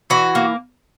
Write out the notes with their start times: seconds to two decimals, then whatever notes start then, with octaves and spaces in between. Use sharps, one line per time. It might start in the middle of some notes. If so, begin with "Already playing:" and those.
0.10 E3 F#4
0.35 A#3